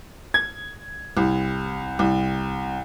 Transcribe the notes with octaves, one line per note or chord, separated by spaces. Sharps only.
G#6
C2
C2